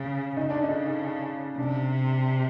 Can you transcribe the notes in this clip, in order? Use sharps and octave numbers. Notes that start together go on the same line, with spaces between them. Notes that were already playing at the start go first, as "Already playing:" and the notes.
Already playing: C#3
C#3 D#4
D4
D#4
C3 D4